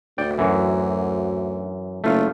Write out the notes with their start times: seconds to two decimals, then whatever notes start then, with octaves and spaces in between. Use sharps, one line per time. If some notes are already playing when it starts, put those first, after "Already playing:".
0.18 D2 D5 G5
0.38 F#2 E3
2.04 F#1 A3 F4